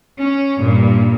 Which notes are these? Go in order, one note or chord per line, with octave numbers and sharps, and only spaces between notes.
C#4
G2 A#2